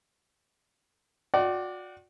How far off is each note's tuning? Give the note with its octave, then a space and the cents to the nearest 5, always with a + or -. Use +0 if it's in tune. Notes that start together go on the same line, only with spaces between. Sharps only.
F#4 -35 D5 +0 F#5 +45